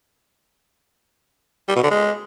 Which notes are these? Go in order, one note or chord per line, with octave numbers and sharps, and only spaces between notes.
G3
B2
D3
G#3